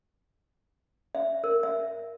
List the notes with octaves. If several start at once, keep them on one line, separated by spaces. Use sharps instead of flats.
E5
A#4
E5